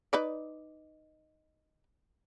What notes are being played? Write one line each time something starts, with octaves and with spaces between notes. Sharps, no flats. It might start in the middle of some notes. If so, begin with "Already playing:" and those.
D#4 B4 D5